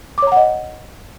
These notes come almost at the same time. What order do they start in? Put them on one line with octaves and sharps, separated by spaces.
D6 C#5 A#5 F#5 D#5